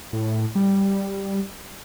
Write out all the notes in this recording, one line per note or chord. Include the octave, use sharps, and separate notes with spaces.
A2
G3